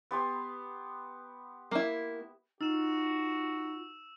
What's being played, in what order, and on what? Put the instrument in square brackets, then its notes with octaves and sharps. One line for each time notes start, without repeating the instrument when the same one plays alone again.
[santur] B3 G4 C6
[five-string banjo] A#3 E4
[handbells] D#4 [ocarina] F4 [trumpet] F#4 [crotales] E6 E7